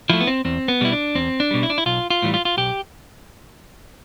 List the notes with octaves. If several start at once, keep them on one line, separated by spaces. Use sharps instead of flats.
F3 A3 E4
B3
C4
E2 C4
B3
B2 G3 E4
D4
E2 C4
D4
B2 G3
E4
D4
E4
B1 F4
F4
A2 E3 G3
F4
F4
B1 G4